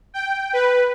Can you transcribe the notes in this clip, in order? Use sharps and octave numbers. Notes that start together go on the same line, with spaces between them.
G5
B4